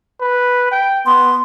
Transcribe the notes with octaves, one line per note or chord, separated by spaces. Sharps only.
B4
G5
B3 C6